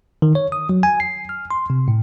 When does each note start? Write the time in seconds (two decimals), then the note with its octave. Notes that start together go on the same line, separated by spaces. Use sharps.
0.22 D#3
0.35 C#5
0.52 D#6
0.69 F#3
0.83 G#5
1.00 C7
1.29 F6
1.51 C6
1.70 C3
1.88 A2